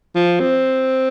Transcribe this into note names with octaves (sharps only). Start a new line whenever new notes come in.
F3
C4